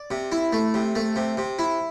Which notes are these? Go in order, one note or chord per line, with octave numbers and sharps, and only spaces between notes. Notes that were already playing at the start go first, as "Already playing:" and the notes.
Already playing: D5
C3
E4
A3
C3
A3
C3
C3
E4